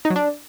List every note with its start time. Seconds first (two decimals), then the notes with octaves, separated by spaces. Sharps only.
0.05 D#4
0.10 F#3
0.16 D4